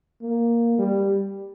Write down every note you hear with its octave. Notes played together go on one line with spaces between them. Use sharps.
A#3
G3